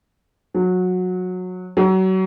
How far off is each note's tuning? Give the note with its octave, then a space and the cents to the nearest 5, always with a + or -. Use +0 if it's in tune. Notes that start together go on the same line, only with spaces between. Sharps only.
F#3 -20
F#3 +30